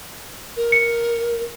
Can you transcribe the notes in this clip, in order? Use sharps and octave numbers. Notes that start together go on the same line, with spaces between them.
A#4
C#7